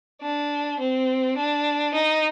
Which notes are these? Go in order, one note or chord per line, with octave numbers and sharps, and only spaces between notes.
D4
C4
D4
D#4